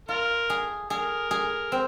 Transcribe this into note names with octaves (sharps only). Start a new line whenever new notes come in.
F4 A#4
G#4
G#4 A#4
G#4
C4